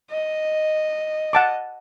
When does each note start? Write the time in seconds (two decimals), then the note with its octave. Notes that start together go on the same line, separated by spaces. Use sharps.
0.11 D#5
1.33 F#5 A5 D6